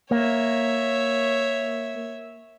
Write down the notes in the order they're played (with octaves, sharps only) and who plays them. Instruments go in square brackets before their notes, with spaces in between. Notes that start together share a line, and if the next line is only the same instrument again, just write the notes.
[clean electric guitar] A#3 [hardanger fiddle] C#5 E5